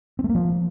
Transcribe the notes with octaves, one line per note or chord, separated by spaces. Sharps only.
C4
A3
A#3
F3